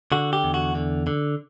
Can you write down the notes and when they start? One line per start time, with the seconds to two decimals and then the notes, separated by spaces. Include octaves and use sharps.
0.12 D3 F#4
0.33 G4
0.44 E2
0.54 F#4
0.75 D3
1.07 D3